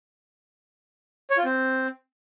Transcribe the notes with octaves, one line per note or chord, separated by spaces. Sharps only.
C#5
F4
C4